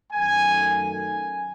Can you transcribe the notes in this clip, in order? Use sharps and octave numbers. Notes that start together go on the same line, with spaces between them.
F#2 D#3 A3 G#5
G#5